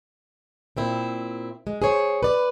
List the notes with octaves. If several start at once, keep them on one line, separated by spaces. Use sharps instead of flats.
A#2 C4 E4
G#3
G#4 C5 C#5
B4 D5